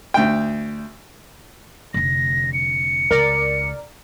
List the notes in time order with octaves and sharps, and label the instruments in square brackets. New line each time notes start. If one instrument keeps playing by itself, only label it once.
[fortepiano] D2 G5
[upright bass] F1 D3 [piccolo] A#6
[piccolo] C#7
[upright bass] C#2 [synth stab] A#4 D5